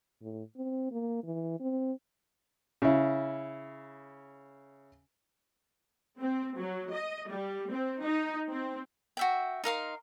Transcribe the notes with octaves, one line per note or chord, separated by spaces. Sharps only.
A2
C4
A#3
E3
C4
C#3 E4
C4
F#3
D#5
G3
C4
D#4
C4
F#4 E5 G5
D#4 A#4 F5 C6